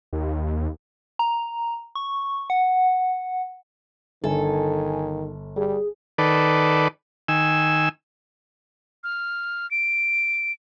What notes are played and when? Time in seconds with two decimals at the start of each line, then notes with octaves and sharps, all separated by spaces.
0.13 D#2
1.19 A#5
1.95 C#6
2.50 F#5
4.24 G1 D#3 A4 G#5
5.56 G3 G#4
6.18 D#3 A4 B4 D5
7.28 D#3 G#5 E6
9.04 F6
9.71 D7